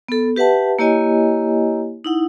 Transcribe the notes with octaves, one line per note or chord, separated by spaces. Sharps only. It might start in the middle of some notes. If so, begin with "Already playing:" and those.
B3 A4
G4 B4 E5 F#5 A5
A#3 E4 G4 C#5 D#5 G#5
D#4 E4 F#5